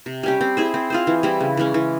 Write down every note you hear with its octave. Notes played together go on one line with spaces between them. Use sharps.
C3
G3 C#4 G4
C4
E4 G#4 C5
C4
F4 G#4 C5
E3
G3 C4 E4
C#3
E3 G#3 C#4
E3